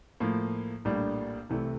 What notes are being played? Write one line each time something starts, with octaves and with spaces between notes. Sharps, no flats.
A2 F3 A#3
A#1 A2 G3 A#3 D4
C2 C3 E3 A3